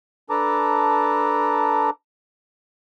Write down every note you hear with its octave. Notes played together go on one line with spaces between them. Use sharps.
D4 A4 B4 A5 A#5 D6